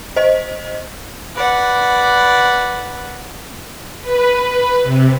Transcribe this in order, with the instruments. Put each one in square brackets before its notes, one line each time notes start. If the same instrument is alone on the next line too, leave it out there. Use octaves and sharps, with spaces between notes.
[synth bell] C5 D#5
[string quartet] B4 D5 F#5
[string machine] B4
C3